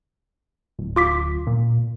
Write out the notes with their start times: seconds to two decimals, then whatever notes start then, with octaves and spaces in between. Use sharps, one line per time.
0.79 D1
0.96 F4 D6 B6
1.47 A#2